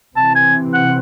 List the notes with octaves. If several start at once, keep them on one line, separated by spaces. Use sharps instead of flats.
C3 E3 C4 A5
G#5
F#5